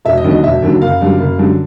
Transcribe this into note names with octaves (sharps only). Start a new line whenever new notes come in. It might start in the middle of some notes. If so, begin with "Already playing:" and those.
E1 E5
D#5
D#2 D3 F#3
D#5
E1 E5
D#2 D3 F#3
F#1 F5
F#2 D3 G3
F#1
F#2 D3 G3